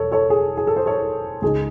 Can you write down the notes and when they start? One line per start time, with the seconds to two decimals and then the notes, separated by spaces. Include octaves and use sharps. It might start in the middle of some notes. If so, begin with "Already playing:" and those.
Already playing: E1 A4 C#5
0.12 A4 C#5
0.30 G#4
0.57 G#4
0.67 A4
0.76 C5
0.86 A4 C#5
1.42 C#2 C#3 G#3 D#4 G#4